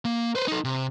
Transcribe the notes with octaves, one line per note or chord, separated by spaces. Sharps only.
A#3
B4 C5
D#4 A4
C3